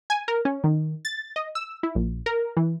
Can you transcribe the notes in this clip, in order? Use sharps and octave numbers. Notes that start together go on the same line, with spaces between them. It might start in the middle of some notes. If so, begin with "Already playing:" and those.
G#5
A#4
C#4
D#3
A6
D#5
E6
E4
A#1
A#4
E3